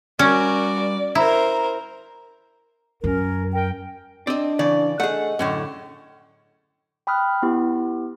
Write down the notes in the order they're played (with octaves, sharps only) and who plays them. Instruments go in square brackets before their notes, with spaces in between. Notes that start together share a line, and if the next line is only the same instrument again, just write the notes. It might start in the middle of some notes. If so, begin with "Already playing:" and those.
[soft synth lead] G3 [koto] C#4 [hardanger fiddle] F#4 A#4 [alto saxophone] D5
[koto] E4 [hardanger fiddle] A#4 C5 [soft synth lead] A#5
[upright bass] F#2 [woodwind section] C#4 A#4
[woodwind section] A#4 G5
[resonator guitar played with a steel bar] C4 [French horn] D4 [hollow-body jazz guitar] D5 D#5
[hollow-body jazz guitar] C#3 E3 [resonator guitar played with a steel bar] D5
[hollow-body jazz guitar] A3 G#4 [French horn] D#5 [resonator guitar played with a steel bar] F#5
[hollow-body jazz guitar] F#2 A2 D3 [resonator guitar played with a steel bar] C#4
[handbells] G5 B5 D#6 F6 F#6
B3 E4 G4